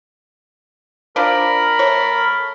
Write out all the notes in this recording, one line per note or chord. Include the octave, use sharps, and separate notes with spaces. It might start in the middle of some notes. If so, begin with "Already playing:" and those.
F3 D4 A#4 B5
A3 C#5